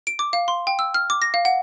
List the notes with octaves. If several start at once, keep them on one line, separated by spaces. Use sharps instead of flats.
D7
D6
F5
C6
G5
E6
F6
D6
A#6
F5
F#5